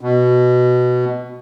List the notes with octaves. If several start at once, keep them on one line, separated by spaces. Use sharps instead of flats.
B2